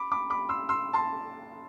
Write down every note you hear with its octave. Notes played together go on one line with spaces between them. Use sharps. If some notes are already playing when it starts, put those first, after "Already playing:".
Already playing: B5 D6
B5 D6
B5 D6
C6 E6
C6 E6
A5 C6